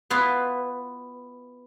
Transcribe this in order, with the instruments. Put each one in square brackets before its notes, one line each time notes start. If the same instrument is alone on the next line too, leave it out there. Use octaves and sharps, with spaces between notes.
[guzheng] B3 E4 F4 B4 F5